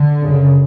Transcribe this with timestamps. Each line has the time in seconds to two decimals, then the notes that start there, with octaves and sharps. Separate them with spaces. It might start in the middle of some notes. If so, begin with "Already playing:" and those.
Already playing: D3
0.23 F#2 C#3